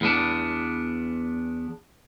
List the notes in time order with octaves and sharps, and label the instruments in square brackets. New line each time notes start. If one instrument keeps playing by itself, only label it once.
[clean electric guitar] E2 B3 D4